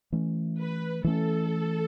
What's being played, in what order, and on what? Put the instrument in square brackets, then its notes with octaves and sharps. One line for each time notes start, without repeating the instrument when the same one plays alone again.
[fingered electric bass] E3 A3 C#4
[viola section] B4
[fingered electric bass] E3 A3 C#4 [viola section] A4